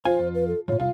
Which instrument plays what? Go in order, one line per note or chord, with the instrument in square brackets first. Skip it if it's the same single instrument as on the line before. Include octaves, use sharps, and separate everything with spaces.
[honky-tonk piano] F3 F4 [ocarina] C5 [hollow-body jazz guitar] F5 G#5
[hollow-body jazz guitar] F2
[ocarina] B4
A4
[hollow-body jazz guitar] F2 A2 [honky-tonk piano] F4 [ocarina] C#5
[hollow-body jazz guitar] C2 [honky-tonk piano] F4 [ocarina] F5